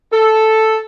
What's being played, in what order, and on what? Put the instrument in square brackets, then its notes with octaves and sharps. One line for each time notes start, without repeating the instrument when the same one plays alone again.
[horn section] A4